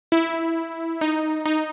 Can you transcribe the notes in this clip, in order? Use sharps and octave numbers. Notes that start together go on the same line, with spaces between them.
E4
D#4
D#4